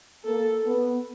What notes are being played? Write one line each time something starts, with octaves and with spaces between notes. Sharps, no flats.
A#3 A4
B3